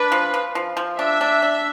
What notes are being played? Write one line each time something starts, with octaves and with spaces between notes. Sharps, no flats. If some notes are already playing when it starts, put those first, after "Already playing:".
Already playing: D4 B4
F3
F3
F3
F3
D4 E5
D4
D4